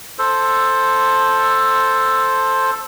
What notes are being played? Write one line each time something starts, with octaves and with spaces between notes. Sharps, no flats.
A4 C5